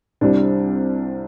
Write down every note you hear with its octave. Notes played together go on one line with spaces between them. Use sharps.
C2 C3 G3 D4